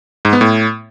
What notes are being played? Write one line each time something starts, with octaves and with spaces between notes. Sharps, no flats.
G#2
B3
A2